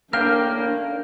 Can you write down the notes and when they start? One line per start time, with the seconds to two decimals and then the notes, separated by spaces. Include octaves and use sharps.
0.13 A2 A#3 D4 A#4 F5 G5 F6